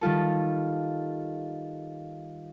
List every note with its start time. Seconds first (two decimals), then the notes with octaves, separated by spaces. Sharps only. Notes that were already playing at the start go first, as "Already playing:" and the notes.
0.01 D#3 G3 F4 A4